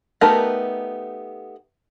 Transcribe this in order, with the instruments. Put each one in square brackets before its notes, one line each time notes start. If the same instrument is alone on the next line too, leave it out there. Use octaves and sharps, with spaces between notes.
[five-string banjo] A3 B3 D#4 G4 A#4